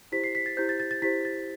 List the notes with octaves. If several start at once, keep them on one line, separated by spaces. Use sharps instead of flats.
E4 G4 C5 B6
C7
B6
A6
E4 G4 C5 G6
A6
A6
A6
E4 G4 C5 B6
A6